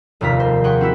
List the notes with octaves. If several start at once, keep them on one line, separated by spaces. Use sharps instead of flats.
F1 D#2 C3 F4 A#4 B6
C5
G#4 F#5 G5 C6 C#6
C4 E4 F#4 E5